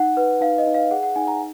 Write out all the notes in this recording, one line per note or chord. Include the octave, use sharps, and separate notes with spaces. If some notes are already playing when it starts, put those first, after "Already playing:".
Already playing: D#4 F#5
B4
D#4 F5
D#5
D#4
F5
G#4 F#5
F#5
D#4 G#5
A#5